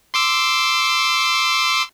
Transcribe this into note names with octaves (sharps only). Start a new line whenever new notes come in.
C6 D6 E6